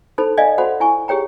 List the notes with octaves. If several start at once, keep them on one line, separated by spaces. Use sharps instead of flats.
D#4 A4 C5 B5
D5 D#5 F5 G#5
F#4 A4 C5 F#5 B5
E4 G#5 C#6
G4 G#4 C#5 G5 A#5